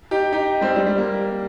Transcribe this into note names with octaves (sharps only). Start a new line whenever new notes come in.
D#4 G4
D#4 G4
G3 C4
G3
G3
A#3